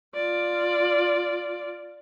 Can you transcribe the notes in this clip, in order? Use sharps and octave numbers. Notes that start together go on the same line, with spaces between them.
F4 D5